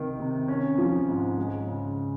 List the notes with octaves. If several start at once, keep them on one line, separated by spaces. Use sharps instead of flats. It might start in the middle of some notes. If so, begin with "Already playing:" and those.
Already playing: C3 D#3
C3
C#4
F3
G#2
G#3
C#3